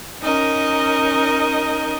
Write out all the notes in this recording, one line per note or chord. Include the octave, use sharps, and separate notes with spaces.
C#4 D#4 A#4 D#5